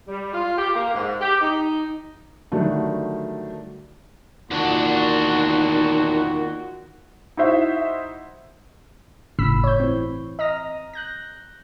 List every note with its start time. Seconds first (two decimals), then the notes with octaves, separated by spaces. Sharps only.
0.08 G3
0.33 F4
0.57 G4
0.74 A#3
0.94 G#2
1.21 G4
1.41 D#4
2.52 D3 D#3 F#3 G3 A3 D4
4.51 E2 A#2 D#3 D4 F#4
7.37 D#4 E4 F#4 C5 E5
9.39 G1 A2 C#3 B5 E6 B6
9.64 C#5 G6
9.80 E3 C4
10.39 D#5 A#5 D#6 F6 A#6
10.93 F#6 G6 A#6